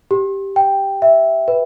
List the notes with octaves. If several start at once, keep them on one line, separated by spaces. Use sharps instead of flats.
G4
G5
E5
B4